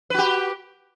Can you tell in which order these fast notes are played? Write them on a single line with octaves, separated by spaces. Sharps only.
B4 F#4 G4